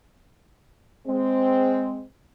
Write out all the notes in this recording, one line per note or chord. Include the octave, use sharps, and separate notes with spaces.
G#3 C4